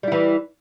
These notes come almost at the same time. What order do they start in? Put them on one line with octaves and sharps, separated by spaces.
G3 E4 E3